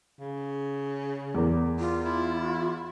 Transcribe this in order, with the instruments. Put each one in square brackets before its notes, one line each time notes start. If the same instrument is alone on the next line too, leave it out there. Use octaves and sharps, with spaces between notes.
[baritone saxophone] C#3
[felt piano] E2 A#4
[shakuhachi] F4
[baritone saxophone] E4